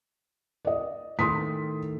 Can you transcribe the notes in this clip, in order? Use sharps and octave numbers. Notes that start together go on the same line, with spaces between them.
D5 D#5
A2 D#3 C6 D#6 B6